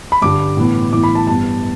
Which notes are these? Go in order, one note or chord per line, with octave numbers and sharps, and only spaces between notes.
B5
G2 D3 G3 D6
A2 E3 B3
A2 E3 B3 D6
B5
A5
G2 G3 B3 A5